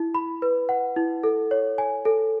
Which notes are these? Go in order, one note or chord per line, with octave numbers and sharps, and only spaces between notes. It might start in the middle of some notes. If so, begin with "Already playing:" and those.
Already playing: E4
B5
B4
F#5
E4
A4
C#5
G#5
A4